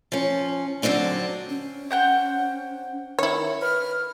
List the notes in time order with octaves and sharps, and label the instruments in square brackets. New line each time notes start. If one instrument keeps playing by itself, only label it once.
[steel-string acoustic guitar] F3 C#4
D3 F#3 C4 D4 D#4
[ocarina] C#4
[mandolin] C5 F#5 G5
[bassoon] D#3 [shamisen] E4 C#5
[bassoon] B4 [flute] F6